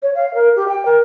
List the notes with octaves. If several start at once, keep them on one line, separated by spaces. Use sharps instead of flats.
C#5
F5
A#4
G4
G5
A#4